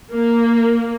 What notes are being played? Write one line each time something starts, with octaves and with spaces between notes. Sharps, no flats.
A#3